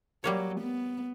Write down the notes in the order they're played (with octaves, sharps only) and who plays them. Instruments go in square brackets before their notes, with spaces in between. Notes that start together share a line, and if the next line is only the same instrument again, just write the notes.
[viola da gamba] F#3 [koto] G3 A#3 C#5
[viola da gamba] B3